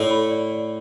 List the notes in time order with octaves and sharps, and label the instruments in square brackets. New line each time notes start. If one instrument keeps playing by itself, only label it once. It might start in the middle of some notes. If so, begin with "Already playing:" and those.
Already playing: [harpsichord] A2 A3 [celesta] D5
[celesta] B5
D5
D5